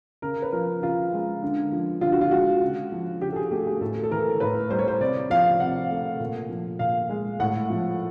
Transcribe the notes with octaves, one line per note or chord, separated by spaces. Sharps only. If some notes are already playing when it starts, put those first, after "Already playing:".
C#3 A#4
B4
F3 A#4
C#3 F4
G#3
D3
F3
D3 F4
F#4
F4
G#3 F#4
C#3
F3
C#3 G4
A4
G#4
A3 G4
G#4
A2 A4
A4
E3 A#4
A2 B4
G3 C5
C#5
C5
C3 D5
F3 F5
C3 F#5
A3
A#2
F3
A#2 F5
G#3
A2 F#5
F3